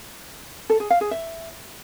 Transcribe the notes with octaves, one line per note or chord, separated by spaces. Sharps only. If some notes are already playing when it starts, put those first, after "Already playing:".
A4
G#4
F5
G#4
E5